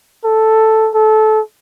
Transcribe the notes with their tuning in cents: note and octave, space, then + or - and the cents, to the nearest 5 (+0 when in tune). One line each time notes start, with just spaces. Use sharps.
A4 +0
A4 -20